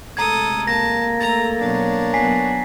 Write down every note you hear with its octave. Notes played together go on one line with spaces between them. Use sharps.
C3 G#3 A3 A4 A#5 D#6 G#6
A#3 A5 A#6
A3 A4 A#5 A6
B2 F#3 D4 C#5
F#3 B3 F#4 G#5 B6 C7